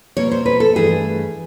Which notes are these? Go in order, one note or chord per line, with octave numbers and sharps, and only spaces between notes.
B2 G3 A#3 C#5
C5
B4
A4
G2 E3 A3 G#4